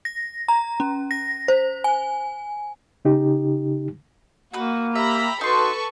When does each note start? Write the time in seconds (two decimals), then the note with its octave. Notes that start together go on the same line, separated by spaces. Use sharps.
0.05 A#6
0.48 A#5
0.80 C#4
1.11 A#6
1.48 C5
1.84 G#5
3.05 C#3 D#4 G4
4.53 A#3 D#4 F#4 B4
4.96 G4 E5 A#5 B5
5.41 D#4 F#4 A4 B4 C6 C#6